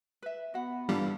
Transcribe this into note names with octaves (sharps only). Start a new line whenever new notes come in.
B4 E5
B3 F#4 F#5
G2 D3 E3 G3 F5